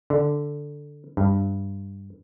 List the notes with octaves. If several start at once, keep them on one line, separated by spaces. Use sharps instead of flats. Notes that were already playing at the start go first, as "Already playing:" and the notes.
D3
G2